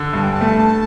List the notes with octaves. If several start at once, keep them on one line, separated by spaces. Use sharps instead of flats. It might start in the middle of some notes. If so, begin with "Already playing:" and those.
Already playing: D3
G2 A5
G5
A5
A3